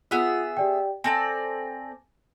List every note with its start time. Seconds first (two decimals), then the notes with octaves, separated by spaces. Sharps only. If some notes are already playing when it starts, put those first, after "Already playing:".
0.11 B3 F4 G#4 E5 F#5 E6
0.57 G4 D5 G5
1.04 C4 A4 D5 G#5 A#6